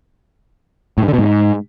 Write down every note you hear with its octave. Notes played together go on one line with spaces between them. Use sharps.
A2
G2
D3
B2
G#2